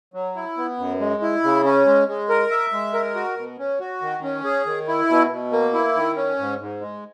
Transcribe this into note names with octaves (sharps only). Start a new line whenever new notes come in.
F#3
E4
B3
F#2
G#3
E4
C#3
C#4
G#3
G#3
A#4
E5
G#3
A#4
F#4
B2
C#4
F#4
D#3
C#4
G#4
D#3
E4
B2
B2
A#3
E4
D#3
C#4
G#2
G#2
G#3